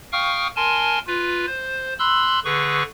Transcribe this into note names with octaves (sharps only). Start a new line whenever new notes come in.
F5 G5 C#6 D#6 F6
A#4 G#5 A5 C6
F4 B4
C5
B5 C6 E6 F#6
D3 G#4 B4 C#6